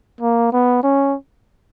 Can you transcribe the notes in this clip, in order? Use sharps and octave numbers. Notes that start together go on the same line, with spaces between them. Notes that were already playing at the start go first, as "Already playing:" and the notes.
A#3
B3
C#4